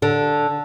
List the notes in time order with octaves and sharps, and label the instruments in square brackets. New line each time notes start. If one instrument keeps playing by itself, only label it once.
[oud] D3